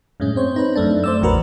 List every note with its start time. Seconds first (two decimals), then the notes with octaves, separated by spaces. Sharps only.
0.20 F#2 A2 G#3 C#4
0.36 C4 C5 C#5
0.54 C4 D#4 B4
0.75 F#2 A3 D4
1.04 C5 D5 E6
1.21 A1 E2 A2 F#4 A#4 B4